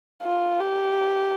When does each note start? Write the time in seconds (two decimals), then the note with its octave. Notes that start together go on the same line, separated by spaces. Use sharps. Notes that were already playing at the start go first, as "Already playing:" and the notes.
0.23 F4
0.60 G4